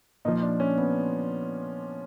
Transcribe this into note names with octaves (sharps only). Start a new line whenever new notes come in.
A#2 F3 D#4
D4
C#4
B3